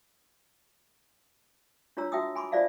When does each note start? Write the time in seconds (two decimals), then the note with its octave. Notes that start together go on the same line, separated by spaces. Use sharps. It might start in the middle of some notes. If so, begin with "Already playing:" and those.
1.97 D4 F4 C#5 A#5 E6
2.12 F#4 E5 G5 A5 D#6 E6
2.35 G#5 B5 C6 D6
2.52 F4 C5 D5 E5 F5 A5